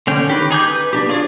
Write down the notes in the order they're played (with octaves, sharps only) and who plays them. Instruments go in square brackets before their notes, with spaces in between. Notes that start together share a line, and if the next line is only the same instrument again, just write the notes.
[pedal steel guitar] D3 C#4 G5
D#3 G4 B4
D#4 G#4 D6 G6
B4
D4 D#4 G4
F4 G#4 C#5 D5